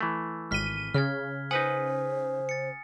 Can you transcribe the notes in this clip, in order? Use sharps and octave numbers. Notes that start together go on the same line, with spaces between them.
E3 A3
G#1 F6 B6 D#7 G7
C#3 F6 G#6
D#4 B4 C5 F#5 G#5 D#6
A6 C#7